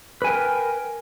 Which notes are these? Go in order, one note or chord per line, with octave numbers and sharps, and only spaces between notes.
A#4 B4 G5 G#5